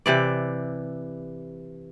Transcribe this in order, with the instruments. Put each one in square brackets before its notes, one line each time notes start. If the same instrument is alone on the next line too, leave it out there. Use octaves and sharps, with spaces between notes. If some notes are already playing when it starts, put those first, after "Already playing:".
[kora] C3 E3 D5